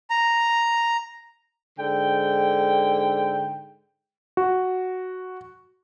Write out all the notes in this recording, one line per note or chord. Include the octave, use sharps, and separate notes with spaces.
A#5
G#2 D3 G5
F#4